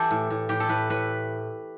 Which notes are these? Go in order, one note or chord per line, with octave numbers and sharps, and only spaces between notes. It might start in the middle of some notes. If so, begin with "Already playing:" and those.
Already playing: E3 G4 A4
A2
A2
A2 G4
A4
A2 B4
A2 B4